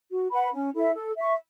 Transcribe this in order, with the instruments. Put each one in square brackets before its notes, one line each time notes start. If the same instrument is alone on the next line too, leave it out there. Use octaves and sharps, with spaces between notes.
[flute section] F#4
B4 F#5 B5
C#4
E4 A4 E5
A4
E5 C#6